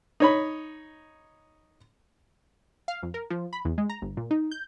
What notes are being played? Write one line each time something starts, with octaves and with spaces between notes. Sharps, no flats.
D#4 C#5 B5
F5
F2
A#4
F3
B5
E2
G#3
A#5
G1
A#2
D#4
G6